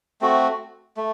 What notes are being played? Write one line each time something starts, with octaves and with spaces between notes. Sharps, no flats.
A3 C4 F#4
A3